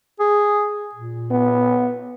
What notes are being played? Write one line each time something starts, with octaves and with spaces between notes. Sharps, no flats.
G#4
A#2
B3